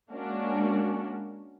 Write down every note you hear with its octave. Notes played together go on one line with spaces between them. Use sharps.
G#3 A#3 C#4 D4 F#4